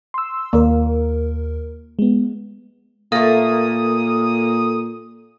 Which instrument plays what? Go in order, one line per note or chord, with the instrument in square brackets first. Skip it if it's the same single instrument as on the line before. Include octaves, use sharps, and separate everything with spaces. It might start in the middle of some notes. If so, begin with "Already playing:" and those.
[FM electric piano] C6 E6
[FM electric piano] D#2 A#4 [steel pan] A#3
[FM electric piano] G#3 B3
[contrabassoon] A#2 [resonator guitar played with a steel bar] A3 A#3 [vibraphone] A4 [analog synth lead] D#6